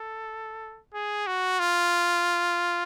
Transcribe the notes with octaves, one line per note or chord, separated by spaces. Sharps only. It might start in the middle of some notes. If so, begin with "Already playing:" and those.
Already playing: A4
G#4
F#4
F4